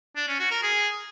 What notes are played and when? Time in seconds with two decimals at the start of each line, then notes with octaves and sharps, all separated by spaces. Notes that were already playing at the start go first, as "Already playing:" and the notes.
0.16 D4
0.28 C#4
0.39 F#4
0.51 A#4
0.63 G#4